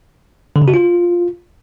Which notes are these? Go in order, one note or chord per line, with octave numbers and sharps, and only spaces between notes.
D3
C#3
F#4
F4